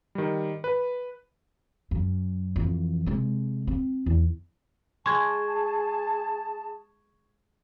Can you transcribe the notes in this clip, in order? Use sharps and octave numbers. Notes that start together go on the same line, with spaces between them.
D#3 G3
B4
F#2
F2 E3
C3 G#3
C4
E2
G#3 G#4 A5 C#6 G#6